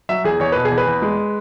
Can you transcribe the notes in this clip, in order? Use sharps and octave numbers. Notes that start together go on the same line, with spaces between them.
F#3 E5
E2 G#4
E2 C#5
B2 B4
G#4
E2
B4
E2
G#3